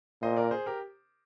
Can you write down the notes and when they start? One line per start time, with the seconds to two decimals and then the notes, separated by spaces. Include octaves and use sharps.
0.22 A#2 C5 D#5
0.36 A#4 D5
0.51 G#4 C5
0.66 G4 A#4